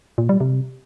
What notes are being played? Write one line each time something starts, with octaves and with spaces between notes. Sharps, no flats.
A#2
G3
C3